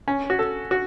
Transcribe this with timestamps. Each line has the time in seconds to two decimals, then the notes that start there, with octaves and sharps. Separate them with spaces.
0.08 C#4
0.30 F#4
0.39 A4
0.71 F#4